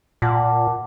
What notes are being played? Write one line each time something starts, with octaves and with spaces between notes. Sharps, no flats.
A#2 F#5 A5 D6